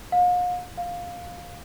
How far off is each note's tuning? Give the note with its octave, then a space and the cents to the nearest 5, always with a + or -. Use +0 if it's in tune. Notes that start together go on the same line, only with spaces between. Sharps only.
F5 +40
F5 +10